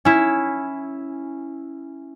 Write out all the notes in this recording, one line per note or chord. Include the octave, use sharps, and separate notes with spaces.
C#4 E4